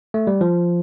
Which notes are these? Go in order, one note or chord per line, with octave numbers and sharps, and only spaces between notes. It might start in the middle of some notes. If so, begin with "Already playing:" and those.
A3
G3
F3